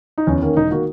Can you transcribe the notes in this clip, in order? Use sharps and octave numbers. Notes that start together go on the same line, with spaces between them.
D#4
E2 C#4
D#3 A#3 C#4
E1 D#4
D#3 A#3 F#4